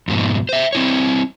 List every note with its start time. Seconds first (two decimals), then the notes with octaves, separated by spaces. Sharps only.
0.08 F2 G#2 B2
0.49 C5 E5
0.73 C4 E4 C#5